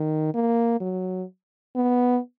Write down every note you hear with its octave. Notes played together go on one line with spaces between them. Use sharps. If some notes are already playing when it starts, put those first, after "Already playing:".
Already playing: D#3
A#3
F#3
B3